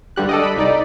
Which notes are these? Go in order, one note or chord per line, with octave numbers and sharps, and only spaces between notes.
G2 D3 G3 F#6
A4 D5 D#5
B5
C2 D#4 D5